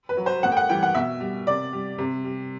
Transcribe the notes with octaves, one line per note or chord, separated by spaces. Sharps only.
B4
F#3
C5
A2 F#5
G5
F#5
E3 G3 G5
F#5
B2 E5
G3
C3 D5
G3
C3
G3